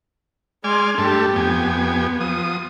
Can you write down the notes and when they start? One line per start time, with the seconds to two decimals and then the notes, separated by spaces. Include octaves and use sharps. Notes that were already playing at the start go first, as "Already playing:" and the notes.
0.64 G#3 D5 G#5 C6 F6
0.98 G2 A3 D4 G4 A4
1.36 F2 B3 G4 G#5
2.21 F3 D#6